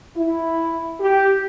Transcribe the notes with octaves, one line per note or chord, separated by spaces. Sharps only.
E4
G4